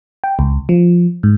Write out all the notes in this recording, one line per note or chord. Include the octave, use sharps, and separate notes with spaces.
G5
C#2
F3
G#2